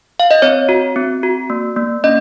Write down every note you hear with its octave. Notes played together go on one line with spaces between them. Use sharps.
F5
D#5
C4 C#5
F#4
C4
F#4
A#3
A#3
C#4 D#5